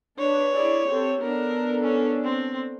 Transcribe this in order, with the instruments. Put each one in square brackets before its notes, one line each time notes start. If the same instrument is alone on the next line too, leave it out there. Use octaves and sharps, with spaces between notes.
[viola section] D4 B4 [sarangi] C#5
[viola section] E4 G#4 D5
C4 G4 A4
[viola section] B3 D4 A4 [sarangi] A#4
[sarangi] C#4
C4